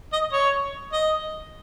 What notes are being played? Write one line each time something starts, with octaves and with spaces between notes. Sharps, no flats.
D#5
C#5
D#5